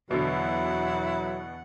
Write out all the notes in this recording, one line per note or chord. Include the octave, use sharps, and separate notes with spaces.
E2 B2 D3 F#3 E4 F#5